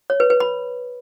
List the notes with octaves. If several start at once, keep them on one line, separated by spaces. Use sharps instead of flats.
C#5
B4
B4
B5